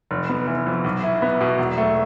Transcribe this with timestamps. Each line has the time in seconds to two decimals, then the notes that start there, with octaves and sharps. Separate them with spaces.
0.11 F1
0.29 B3
0.47 E3
0.67 F2
0.84 B1
1.04 E4
1.22 B3
1.41 B2
1.58 E1
1.78 A3